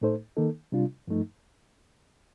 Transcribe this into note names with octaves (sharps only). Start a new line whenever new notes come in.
A2 A3 D#4 A4 C5
D#3 A#3 D#4 A4
C3 G3 D4 F4
G2 F3 A3 D#4